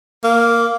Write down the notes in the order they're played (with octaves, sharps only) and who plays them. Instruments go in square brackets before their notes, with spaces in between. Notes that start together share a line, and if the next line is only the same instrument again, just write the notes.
[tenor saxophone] A#3